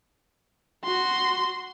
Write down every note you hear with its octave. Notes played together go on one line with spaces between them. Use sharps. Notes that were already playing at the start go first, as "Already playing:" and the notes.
F#4 C6